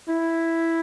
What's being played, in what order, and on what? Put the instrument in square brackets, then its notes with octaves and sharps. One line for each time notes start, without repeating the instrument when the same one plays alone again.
[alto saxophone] E4